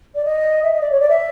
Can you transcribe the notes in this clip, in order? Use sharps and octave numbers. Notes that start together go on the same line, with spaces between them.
D5
D#5
E5
D#5
D5
C#5
D5
E5